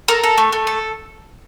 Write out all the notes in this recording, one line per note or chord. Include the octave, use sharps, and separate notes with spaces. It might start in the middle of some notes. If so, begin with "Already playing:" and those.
A4 A#4
A4
A3
A3
A4